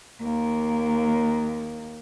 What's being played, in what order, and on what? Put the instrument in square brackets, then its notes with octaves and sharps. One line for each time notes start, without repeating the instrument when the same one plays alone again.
[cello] D#2 A#3